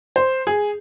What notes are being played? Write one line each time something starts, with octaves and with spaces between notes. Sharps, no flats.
C5
G#4